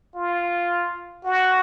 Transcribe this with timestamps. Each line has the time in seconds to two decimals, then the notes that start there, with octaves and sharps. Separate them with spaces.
0.15 F4
1.25 F#4